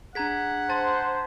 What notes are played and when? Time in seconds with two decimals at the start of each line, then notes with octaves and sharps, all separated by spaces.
0.15 D4 G#4 F#5 A#5 G#6 B6
0.70 C5 A5 A6